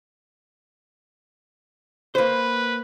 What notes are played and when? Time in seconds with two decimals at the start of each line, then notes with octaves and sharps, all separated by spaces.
2.15 A#3 B4 C5